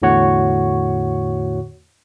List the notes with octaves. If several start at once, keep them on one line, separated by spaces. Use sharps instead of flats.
E2 A2 D3 F#4 C#5 F#5